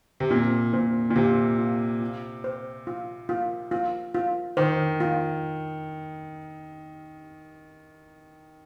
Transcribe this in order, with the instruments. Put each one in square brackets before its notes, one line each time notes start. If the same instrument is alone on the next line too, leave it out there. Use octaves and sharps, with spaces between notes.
[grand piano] C3
[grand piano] A#2 [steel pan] C4
[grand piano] A#2 [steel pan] C5
[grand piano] A#2
[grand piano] C3 [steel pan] F4
[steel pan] F4
F4
C5
F4
F4
F4
F4
[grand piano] D#3 [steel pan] C5
[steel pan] F4